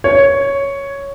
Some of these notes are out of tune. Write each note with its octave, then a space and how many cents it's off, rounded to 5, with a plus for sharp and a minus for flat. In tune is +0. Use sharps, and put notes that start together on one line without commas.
C#5 +5